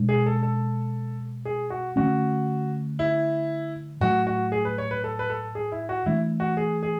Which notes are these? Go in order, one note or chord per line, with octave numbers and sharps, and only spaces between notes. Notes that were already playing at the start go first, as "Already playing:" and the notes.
Already playing: B2 G#3 D4
G#4
A4
A4
G#4
F#4
D3 A3 C#4 F#4
E4
A2 F#3 A3 F#4
F#4
G#4
B4
C#5
B4
A4
B4
A4
G#4
E4
F#4
E3 A3 D4 E4
F#4
G#4
G#4